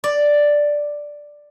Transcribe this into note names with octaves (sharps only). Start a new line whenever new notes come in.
D5